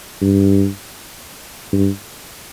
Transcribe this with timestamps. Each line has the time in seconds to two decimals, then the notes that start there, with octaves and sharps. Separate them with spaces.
0.22 G2
1.73 G2